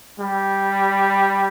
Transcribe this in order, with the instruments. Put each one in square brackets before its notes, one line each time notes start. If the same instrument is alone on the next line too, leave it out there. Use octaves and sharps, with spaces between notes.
[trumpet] G3